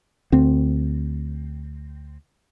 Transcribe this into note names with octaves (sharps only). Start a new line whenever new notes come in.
D2 C4